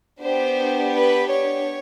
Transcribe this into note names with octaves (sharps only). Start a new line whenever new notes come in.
B3 D4 G4 C5
B4
C#5